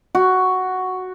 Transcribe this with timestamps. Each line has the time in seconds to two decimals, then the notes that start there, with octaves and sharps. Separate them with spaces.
0.15 F#4